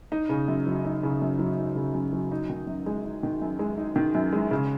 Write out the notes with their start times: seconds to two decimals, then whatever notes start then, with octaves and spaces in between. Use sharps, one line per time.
0.12 D#4
0.29 C#3
0.48 F#2
0.67 F#3
0.85 D#4
1.03 C#3
1.22 F#2
1.39 F#3
1.58 D#4
1.76 C#3
1.94 F#2
2.13 F#3
2.32 D#4
2.50 D#3
2.67 F#2
2.86 G#3
3.04 D#4
3.23 D#3
3.42 F#2
3.59 G#3
3.78 D#4
3.96 D#3
4.15 F#2
4.32 G#3
4.51 C#3